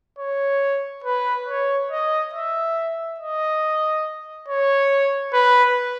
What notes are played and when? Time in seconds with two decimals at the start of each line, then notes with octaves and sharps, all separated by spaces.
0.18 C#5
1.04 B4
1.48 C#5
1.91 D#5
2.33 E5
3.19 D#5
4.48 C#5
5.33 B4